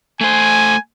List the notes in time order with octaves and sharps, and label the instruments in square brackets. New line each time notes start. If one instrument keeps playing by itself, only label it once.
[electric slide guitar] A3 C5 [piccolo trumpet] G#5